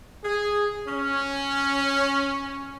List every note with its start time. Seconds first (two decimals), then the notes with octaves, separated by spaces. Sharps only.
0.24 G#4
0.87 C#4